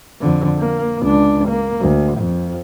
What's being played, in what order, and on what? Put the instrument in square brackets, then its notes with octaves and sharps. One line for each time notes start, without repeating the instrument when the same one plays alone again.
[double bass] F2 D3
A#3
C#2 D4
A#3
D2
F2